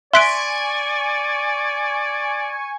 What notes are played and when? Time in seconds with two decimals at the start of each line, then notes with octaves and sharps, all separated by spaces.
0.13 D5 E5 G#5 C6 C#6 F#6 B6 D7